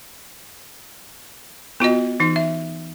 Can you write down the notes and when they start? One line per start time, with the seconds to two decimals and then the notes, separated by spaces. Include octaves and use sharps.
1.80 B3 F4 F#4 D#5
2.20 E3 D#4
2.36 E5